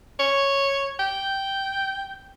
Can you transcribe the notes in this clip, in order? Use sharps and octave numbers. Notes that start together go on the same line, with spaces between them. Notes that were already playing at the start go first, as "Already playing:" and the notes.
C#5
G5